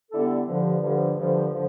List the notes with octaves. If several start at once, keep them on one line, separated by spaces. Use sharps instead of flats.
D3 G3 B3 E4 A4
G2 D3 F3
G2 D3 F3
G2 D3 F3
D3 F3